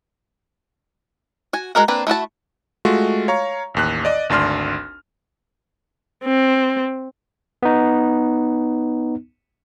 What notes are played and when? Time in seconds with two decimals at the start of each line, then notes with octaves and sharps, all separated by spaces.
1.53 F#4 G#5
1.75 G#3 F#4 A#4 F#5
1.88 A#3 C4 D4 B4
2.07 A3 E4 F#4 A5
2.85 G#3 A3 F4 F#4
3.28 C#5 F5 A#5 C#6
3.74 A1 D#2 F#6
4.05 D5 D#5
4.29 G#1 D2 D4 C6 F6
6.25 C4
7.63 B3 D#4